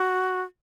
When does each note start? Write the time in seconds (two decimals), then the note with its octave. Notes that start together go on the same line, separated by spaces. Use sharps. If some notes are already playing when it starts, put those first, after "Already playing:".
Already playing: F#4